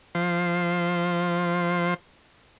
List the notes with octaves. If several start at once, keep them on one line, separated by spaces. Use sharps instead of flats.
F3 C5